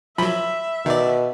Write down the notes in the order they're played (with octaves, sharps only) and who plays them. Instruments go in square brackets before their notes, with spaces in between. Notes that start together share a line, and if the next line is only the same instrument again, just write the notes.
[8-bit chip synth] F3 F#3 [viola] E5 [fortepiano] B5
[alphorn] B2 [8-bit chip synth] D#3 D5